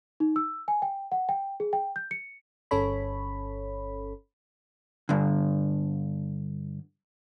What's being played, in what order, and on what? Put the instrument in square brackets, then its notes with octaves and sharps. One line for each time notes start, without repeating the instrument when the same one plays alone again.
[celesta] D#4
E6
G#5
G5
F#5
G5
G#4
G5
G6
C#7
[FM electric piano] G1 C#4 A4 C#5 B5
[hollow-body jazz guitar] G2 D3